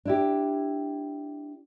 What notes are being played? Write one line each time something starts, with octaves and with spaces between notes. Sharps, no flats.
D4 E4 G4